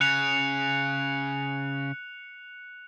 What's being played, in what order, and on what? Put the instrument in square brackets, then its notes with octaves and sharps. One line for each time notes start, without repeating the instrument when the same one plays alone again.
[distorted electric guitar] C#3 [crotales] F#6 C#7 F7